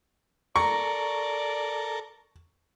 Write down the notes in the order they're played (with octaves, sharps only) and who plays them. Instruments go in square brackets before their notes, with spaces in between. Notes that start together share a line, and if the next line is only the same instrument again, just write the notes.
[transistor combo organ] A4 A#4 [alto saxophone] D5 [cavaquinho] A#5 [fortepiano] C#6